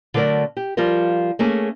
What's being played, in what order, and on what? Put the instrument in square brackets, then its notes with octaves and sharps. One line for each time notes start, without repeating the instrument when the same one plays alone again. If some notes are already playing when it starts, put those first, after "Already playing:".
[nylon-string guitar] D3 F#3 A3 A#4 D5
G4
F3 G3 F4 A#4
A3 A#3 C#4 G#4